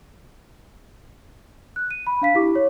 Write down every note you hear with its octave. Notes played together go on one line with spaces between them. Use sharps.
F#6
D#7
B5
D4 F5 B6
E4 G4 D6
C#5